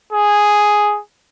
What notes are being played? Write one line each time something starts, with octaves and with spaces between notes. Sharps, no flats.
G#4